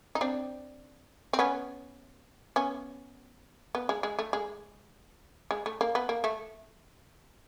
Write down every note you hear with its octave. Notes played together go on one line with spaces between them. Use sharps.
D#4
C4 D4
C4
B3 C#4
B3 C#4
B3
G#3
G#3
A3
G#3
G#3
A3
A#3
B3
A#3
A3